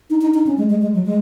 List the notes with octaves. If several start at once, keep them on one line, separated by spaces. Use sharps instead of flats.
D#4
D#4
D#4
C#4
G#3
G#3
G#3
F#3
G#3